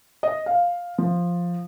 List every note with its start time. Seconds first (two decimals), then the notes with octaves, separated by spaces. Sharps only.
0.23 D#5
0.46 F5
0.98 F3